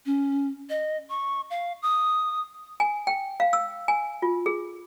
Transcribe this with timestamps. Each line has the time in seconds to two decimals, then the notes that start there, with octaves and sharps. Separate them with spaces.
0.06 C#4
0.70 D#5
1.10 C#6
1.50 F5
1.82 D#6
2.80 G#5
3.07 G5
3.40 F5
3.53 E6
3.88 G#5
4.22 F4
4.46 G#4